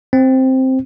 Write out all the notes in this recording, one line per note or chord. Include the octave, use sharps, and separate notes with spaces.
C4